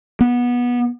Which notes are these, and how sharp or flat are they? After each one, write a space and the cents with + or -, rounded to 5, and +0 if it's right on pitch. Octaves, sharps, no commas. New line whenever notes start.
B3 -20